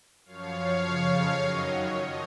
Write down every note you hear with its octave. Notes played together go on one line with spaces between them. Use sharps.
F#2 F3 C#5 F5
F2 C#3 F3
F#2 D#3 F#3 D#5
C#5
F3 D#5